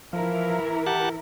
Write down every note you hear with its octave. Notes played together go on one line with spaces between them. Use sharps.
E3 F3 E4 A#4
G4 F#5 A5